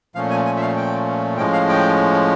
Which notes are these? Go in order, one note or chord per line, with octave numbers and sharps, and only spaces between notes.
A#2 F3 A3 C#4 F5
G#5
G#5
E5
F5
G5
A2 F3 G#3 C#4 G5
F5
G5